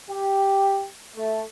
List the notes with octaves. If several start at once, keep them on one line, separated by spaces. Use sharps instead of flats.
G4
A3